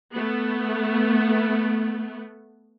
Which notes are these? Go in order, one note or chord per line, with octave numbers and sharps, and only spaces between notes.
A3 B3